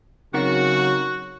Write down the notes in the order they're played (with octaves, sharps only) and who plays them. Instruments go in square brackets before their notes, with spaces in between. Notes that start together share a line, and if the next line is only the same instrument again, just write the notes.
[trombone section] C#3 F#3 [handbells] C4 D#4 A#4 [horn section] F#4